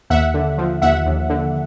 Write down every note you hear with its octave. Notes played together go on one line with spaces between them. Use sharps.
D#2 E5 F#5
D3
F3
D#2 E5 F#5
D#2
D3